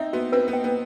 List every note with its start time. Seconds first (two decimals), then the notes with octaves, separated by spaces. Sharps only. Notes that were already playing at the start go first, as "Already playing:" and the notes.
Already playing: C4 D#4 E5
0.13 B3 F#4
0.32 C4 B4
0.48 B3
0.53 G5
0.64 B3